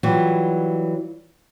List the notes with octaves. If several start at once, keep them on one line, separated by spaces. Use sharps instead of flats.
E3 F#3 G3 F4